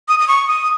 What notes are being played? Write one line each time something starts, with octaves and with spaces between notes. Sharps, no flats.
D#6
D#6
C#6
D#6